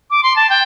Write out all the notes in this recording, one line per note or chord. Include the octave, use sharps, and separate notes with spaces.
D6
C6
A5
G5